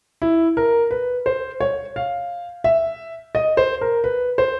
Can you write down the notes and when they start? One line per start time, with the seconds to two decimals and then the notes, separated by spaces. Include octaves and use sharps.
0.22 E4
0.57 A#4
0.91 B4
1.26 C5
1.60 C#5
1.96 F5
2.64 E5
3.35 D#5
3.57 C5
3.81 A#4
4.04 B4
4.38 C5